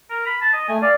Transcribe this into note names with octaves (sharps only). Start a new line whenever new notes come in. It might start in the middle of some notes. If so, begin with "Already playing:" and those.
A#4
B5
A5
D#5
A3 G#5
D5 F5